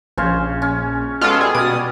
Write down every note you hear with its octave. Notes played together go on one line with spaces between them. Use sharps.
A#1 C#3 C#4 C5
C#4
G#3 B3 C#4 F4 F#4 A4
G3 G#4
B2 D5 D#6